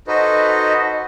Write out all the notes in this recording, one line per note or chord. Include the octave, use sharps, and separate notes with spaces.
D#4 F#4 A4 B4 C5 D#5